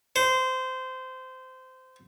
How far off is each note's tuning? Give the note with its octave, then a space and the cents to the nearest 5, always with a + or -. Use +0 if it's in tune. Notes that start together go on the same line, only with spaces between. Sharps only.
C5 -20